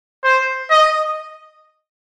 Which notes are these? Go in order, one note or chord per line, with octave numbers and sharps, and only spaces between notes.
C5
D#5